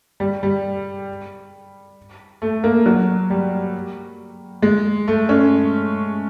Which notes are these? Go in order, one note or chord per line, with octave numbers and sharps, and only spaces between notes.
G3
G3
A3
A#3
F#3
G3
G#3
A3
C#4